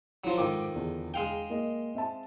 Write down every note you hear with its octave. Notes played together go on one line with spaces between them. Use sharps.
F3 F#3 E4 F4
F2 G#2 D#3 D6
E2 D3 D4
G#3 F5 G5
A#3 D#5
C4 E5 A5